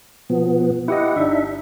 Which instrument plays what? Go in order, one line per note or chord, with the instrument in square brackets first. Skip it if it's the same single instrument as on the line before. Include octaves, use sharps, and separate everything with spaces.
[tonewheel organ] B2 F3 B3
[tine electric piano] E4 G4 D#5 [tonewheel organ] F#5
[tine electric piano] G1 [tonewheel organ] D4 D#4 E5